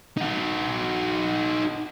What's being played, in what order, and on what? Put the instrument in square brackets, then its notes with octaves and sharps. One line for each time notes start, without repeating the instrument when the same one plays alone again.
[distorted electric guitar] D#4 F#4